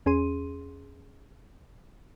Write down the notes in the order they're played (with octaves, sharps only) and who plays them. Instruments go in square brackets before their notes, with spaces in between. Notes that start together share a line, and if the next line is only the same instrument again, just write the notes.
[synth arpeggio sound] E2 C#4 G#4 C6 D#7